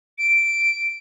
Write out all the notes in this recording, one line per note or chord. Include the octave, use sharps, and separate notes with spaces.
D7